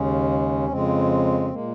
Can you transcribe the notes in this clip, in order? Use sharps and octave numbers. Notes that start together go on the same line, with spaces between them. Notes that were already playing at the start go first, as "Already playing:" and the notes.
Already playing: D#2 C#3 G#3 C#4
F2 C#3 G#3 C4
A#2 G#3 A#3